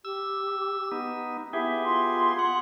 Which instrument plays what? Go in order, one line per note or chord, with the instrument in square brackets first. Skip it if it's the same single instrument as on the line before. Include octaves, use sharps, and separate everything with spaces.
[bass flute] G4 [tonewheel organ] E6
[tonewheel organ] B3 D#4
[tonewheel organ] B3 G4 G#4 [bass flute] E4 [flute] E5
[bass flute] F4 [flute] C6
[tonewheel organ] F#5